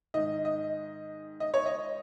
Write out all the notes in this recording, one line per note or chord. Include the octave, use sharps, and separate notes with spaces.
G#2 D#3 D#5
D#5
D#5
C#5
D#5